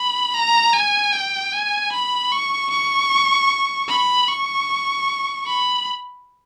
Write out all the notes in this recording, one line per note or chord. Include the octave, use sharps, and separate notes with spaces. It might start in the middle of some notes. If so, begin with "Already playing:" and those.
Already playing: B5
A#5
G#5
G5
G#5
B5
C#6
C#6
B5
C#6
B5